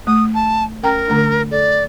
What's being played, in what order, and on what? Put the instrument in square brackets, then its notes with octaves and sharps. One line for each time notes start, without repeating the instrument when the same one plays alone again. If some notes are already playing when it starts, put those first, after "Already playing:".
[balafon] A3 [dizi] D#6
[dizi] A5
[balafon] C#4 G5 A#5 [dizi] A#4
[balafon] D3 A3 D4
[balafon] A4 [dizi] D5